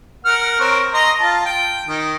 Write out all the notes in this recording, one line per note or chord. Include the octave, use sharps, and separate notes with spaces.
A#4 F#5 F6
C4 A#4 C#5
D#5 A#5 C6
F4 A5
G5
D#3